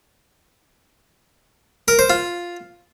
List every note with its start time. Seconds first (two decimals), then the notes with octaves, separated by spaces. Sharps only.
1.88 A#4
1.99 C5
2.10 F4